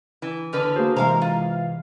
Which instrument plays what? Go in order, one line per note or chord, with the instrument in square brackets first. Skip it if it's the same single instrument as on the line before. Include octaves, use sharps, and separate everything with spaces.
[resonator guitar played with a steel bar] E3
[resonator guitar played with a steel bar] E2 D3 B4 [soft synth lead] F6
[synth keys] A#3 G#4 C5 [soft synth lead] F#4
[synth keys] C3 E3 G#3 [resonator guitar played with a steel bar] A#4 F5 A#5 [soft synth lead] C5
[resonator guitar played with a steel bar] F4 [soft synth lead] F5